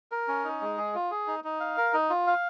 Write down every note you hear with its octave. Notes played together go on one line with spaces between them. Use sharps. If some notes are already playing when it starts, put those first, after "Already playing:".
A#4
C#4
D#4
G#3
G#4
F4
G#4
D#4
D#4
F5
A#4
D#4
F4
F5